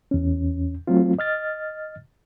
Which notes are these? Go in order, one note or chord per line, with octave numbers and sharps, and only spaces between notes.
E2 C#4
F#3 A3 C4 F4
D#5 F6 A6